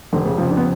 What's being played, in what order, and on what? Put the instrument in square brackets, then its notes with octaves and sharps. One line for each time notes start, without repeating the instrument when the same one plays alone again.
[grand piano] F1 [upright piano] D3
[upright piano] C#3
[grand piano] F2 C#3 [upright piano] F3
[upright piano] D4
B3